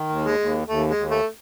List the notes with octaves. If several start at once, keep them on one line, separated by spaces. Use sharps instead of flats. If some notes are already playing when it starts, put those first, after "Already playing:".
Already playing: D#3
D#2
G#3
D#2
D#2 A3
G#3
D#2
A3